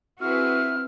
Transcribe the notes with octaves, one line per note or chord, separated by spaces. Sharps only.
C4 E4 F#4 G#4 B4 F6